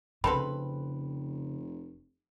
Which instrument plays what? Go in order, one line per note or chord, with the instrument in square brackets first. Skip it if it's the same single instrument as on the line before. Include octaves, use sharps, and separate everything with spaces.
[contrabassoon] F1 [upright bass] C#3 [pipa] C4 A4 B4 [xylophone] B5